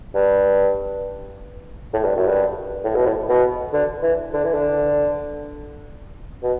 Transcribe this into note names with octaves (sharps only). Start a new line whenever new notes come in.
G2
A2
G2
F#2
G2
A2
B2
A2
B2
D3
E3
D3
E3
D3
B2